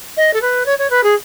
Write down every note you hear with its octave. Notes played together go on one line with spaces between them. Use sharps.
D#5
A4
B4
C#5
C#5
B4
G#4